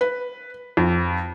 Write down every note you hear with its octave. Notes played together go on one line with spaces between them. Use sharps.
B4
F2